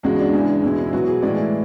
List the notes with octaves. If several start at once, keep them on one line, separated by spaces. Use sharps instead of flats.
E2 C#3 G#3 F#4
D4
E2 C#3 E3 G#3
E2 B2 G#3 E4
E4
B2 F#3 F#4
G#4
A2 E3 G#3 D5
E4